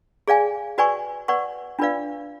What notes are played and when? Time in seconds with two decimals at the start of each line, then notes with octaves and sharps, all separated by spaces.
0.28 G#4 D5 F5 G#5
0.78 F#4 B4 D5 G#5 C#6
1.28 B4 D5 F#5 C#6
1.79 D4 F4 B4 D5 F5